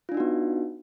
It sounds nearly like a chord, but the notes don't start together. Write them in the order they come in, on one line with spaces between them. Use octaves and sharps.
F4 D4 D#4 F#4 B3